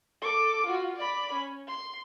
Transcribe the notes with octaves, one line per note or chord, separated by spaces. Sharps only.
A4 D6
F4 F#4
D5 B5
C#4
C6